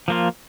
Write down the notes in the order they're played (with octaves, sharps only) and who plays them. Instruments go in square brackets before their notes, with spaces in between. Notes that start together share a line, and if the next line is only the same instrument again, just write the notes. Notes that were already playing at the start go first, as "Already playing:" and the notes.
[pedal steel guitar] F3 A#3 F4